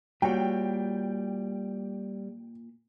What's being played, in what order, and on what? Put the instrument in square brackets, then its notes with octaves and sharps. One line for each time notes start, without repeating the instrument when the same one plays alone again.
[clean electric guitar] A#2 [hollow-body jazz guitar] G3 F#4 C#5 [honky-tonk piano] G5